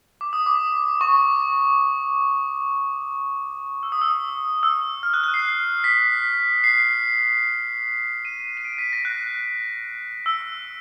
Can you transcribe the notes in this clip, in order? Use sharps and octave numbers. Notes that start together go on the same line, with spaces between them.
D6
D#6
D6
C#6
E6
D#6
E6
E6
F6
F#6
F#6
C7
B6
C7
D#7
D#7
D7
B6
A#6
F#6
E6